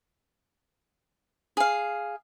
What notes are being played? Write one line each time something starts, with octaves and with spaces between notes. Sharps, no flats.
G#4 F5